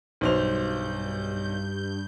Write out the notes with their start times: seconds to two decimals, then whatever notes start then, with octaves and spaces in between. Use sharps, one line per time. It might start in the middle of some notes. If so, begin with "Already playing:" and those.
0.21 B1 G2 C5 G6 F7